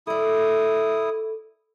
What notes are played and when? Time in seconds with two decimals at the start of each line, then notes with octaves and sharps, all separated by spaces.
0.07 E4 A4 D5 D#6